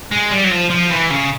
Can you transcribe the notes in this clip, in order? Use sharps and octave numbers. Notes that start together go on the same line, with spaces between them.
G#3
G3
F#3
F3
F3
E3
C#3